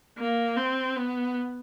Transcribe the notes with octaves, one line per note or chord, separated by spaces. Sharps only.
A#3
C4
B3